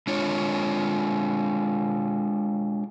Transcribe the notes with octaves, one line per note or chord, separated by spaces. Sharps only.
G#3 D4 F4 C#5